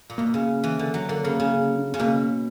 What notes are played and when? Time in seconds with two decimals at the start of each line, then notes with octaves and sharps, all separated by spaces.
0.10 A#2
0.18 B2 A#3
0.34 C#3
0.64 E3
0.79 D3
0.94 F#3
1.09 D3 A#3
1.24 C#3 A#3
1.40 C#3
1.76 D4
1.84 C#4
1.92 C#3 B3
1.99 B2 A#3